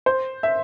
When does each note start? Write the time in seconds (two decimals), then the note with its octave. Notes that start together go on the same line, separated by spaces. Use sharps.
0.06 C5
0.43 E5